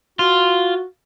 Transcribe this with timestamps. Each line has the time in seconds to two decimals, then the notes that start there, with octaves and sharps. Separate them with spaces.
0.19 F4 F#4